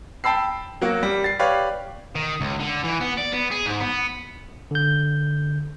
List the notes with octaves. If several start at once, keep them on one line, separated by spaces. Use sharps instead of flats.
G5 A5 B5 E6 C7
F#3 A#3 F#4
G3
A6 C7
G4 B4 C#5 D5 F5
D#3
C#2
D3
E3
B3
D5
B3
G#4
G#2
B3
D3 G6